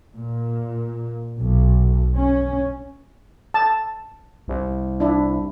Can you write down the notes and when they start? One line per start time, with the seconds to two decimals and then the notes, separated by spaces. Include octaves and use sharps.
0.15 A#2
1.41 B1
2.15 C#4
3.54 A5
4.48 C2
5.00 D4 E4